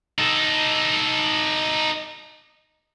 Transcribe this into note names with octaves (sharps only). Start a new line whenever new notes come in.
D#4 A4